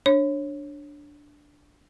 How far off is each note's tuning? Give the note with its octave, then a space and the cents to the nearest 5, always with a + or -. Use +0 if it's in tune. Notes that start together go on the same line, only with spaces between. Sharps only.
D4 +0 C#5 -20